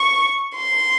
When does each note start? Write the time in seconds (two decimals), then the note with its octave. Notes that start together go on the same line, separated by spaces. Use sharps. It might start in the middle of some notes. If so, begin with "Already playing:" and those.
Already playing: C#6
0.56 C6